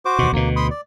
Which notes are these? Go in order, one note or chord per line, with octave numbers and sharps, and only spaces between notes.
F#4 C5 D6
D#2 B2
D2 B2 A#3
B5 C6 D#6
D5